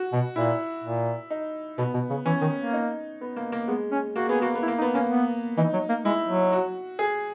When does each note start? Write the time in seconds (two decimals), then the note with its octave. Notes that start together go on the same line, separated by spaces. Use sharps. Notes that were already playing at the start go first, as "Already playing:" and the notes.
Already playing: F#4
0.13 B2
0.36 A#2 E4
0.84 A#2
1.30 D#4
1.78 B2 B3
1.94 B2
2.10 C#3
2.26 E3 C#4
2.41 D#3
2.57 A#3
2.73 D#4
3.21 B3
3.36 A#3
3.52 A#3
3.68 G#3 B3
3.92 C#4
4.15 A#3 F#4
4.28 B3 G#4
4.41 A#3 F#4
4.55 B3
4.63 E4
4.68 A#3
4.78 D#4
4.82 B3
4.94 A#3 C#4
5.10 B3
5.58 E3 D#4
5.73 F#3
5.89 A#3
6.05 G#3 E4
6.28 F#3
6.52 F#4
6.99 G#4